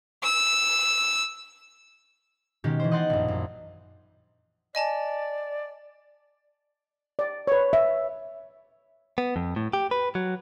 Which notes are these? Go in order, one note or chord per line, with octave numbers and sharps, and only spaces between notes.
E6
B2 D#3 G#3 C#4 G4
E3 C5
D#5 F#5 G5 C6 F#6 A6
A#1 F#2
F#2
D5 D#5 G#5 A5
D5
B4 C#5
E5
B3
F2
A2
G4
B4
F#3